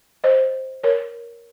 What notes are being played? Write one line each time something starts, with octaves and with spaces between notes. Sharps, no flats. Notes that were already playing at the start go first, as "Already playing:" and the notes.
C5 D#5
A#4 C#5